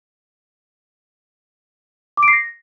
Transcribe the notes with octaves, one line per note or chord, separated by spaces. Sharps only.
D6
D7
C7
A#6